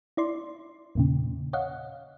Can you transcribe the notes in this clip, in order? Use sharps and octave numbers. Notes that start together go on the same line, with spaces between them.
E4 D5 C6
E2 A#2 C#3
C#5 D#5 F5 F#5